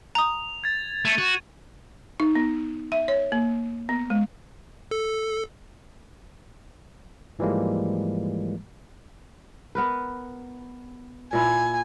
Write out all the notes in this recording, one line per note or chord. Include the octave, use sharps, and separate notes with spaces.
A#5 D#6 F7
G#6 A6
A3 G#6 D#7
F#4
D#4
B3
E5
C#5
A#3
B3
G#3
A4
G#2 E3 F3 G3 G#3 A#3
B3 A#4 B4
A#2 E4 G#5